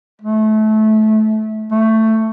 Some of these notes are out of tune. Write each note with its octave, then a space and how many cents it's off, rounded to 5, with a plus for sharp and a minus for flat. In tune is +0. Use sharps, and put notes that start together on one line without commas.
A3 -25
A3 +10